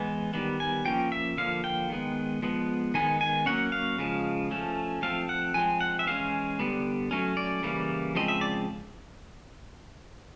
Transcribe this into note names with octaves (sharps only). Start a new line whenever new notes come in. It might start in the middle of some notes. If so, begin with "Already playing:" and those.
Already playing: E3 G#3 B3
D#3 G3 B3
G#5
F3 A#3 C#4 G5
E5
D3 F3 A#3 F5
G5
D#3 G#3 B3
F3 G#3 B3
D#3 G#3 B3 G#5
G#5
F#3 A#3 C#4 F#5
F5
C#3 F3 G#3
F3 A3 C#4
F3 A3 C4 F5
F#5
F3 G#3 C4 G#5
F#5
E5
E3 G#3 C#4 F5
D3 G3 B3
F#3 A3 C#4
D5
C#3 E3 G3 A#3
C#3 F3 G#3 C4 D#5
E5
D5